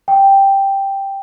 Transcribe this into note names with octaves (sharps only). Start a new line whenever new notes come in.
G5